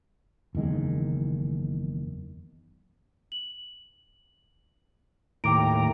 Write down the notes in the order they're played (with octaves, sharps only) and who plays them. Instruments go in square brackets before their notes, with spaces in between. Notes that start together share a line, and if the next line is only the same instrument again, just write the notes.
[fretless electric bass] F#1 E2 D#3 G#3
[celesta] F#7
[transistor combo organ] D#2 A2 A#5 [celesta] G5 D6 D7